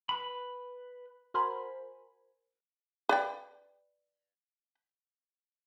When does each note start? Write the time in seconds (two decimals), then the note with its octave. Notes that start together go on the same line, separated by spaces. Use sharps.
0.09 B4 B5
1.34 F#4 A#4 C5 G#5 B5
3.09 B4 D5 G5